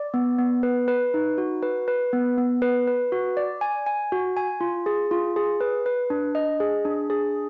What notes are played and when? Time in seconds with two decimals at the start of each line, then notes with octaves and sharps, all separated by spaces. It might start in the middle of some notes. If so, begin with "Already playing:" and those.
Already playing: D5
0.14 B3
0.39 B3
0.63 B4
0.88 B4
1.14 D#4
1.38 F#4
1.62 B4
1.88 B4
2.13 B3
2.38 B3
2.62 B4
2.87 B4
3.12 F#4
3.37 D5
3.61 G#5
3.86 G#5
4.12 F#4
4.37 G#5
4.61 F4
4.86 G#4
5.11 F4
5.36 G#4
5.60 B4
5.86 B4
6.10 D4
6.35 D#5
6.60 G#4
6.85 D4
7.10 G#4